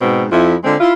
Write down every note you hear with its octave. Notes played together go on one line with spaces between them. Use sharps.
G#2 B2 C4
F2 E4
D3 G#3 C4 F4
E4 F4